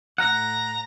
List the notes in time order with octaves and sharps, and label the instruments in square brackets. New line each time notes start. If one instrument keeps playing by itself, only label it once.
[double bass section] A2 [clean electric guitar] F#5 [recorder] A#5